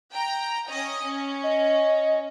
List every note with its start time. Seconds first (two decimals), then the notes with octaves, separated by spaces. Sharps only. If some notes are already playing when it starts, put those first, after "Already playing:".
0.12 G5 A#5
0.68 C#4 D#5
1.03 C#4
1.43 D#5